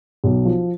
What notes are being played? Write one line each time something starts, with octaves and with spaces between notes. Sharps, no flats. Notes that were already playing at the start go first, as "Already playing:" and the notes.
B1
F3